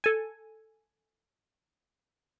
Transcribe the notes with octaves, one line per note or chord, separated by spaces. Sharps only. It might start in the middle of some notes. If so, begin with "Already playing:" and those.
A4 G#5